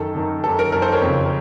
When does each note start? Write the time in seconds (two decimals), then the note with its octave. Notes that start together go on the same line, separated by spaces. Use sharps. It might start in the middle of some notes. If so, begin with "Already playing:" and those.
Already playing: F#2 D#3 A4
0.15 F#2 D#3
0.44 F#2 D#3 A4
0.59 A#4
0.72 F#2 D#3 A#4
0.82 A4 C5
0.92 A#4 C#5
1.02 F2 C#3